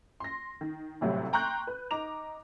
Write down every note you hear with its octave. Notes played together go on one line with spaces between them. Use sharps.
C6 A#6
D#3
G#1 A2 C3 F#3 G3
G5 A#5 C6 C#6 F#6 G6
B4
D#4 A#5 D6 F7